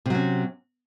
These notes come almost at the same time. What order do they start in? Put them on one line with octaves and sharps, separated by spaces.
C3 F#3 C#4